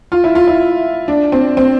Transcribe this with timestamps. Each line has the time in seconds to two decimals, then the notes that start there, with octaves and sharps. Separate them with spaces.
0.12 F4
0.24 E4
0.35 F4
0.47 E4
1.08 D4
1.32 C4
1.57 C4